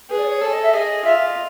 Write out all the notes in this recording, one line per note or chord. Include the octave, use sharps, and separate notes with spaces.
G#4 B4
D5
C#5
A4 C#5
D#5
E5
G#4 D#5
F4 E5
D#5